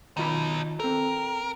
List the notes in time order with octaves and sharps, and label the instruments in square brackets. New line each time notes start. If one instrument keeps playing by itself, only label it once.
[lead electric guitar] B2 D#4 [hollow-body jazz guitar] D#3 F4 B5
[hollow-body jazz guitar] C4 A4 [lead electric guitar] A#4